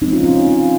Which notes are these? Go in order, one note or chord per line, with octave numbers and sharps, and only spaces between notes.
C3 F3 G#3 C4 D#4
C#4 F4
C#4 F4